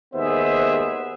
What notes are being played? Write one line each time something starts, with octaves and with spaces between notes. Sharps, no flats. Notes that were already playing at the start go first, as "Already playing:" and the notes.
D#2 G#3 B3 G#4 C5 E5